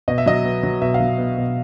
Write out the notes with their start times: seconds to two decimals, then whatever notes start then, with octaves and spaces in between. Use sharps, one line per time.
0.08 B2 D#5
0.18 E5
0.26 F#3 D#5
0.45 B3
0.63 F#3
0.82 B2 E5
0.94 F5
1.00 F#3
1.18 B3
1.38 B2